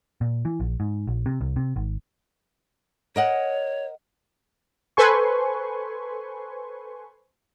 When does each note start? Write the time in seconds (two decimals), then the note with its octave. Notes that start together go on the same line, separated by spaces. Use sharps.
0.21 A#2
0.45 E3
0.60 A#1
0.80 G#2
1.07 A#1
1.26 C3
1.41 C2
1.56 C3
1.76 G#1
3.16 A#4 C#5 D#5 F#5
4.97 A4 B4 C5 G#5 C6 C#6